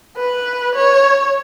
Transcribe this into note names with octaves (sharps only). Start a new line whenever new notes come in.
B4
C#5